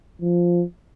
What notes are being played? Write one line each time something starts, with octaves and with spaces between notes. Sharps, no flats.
F3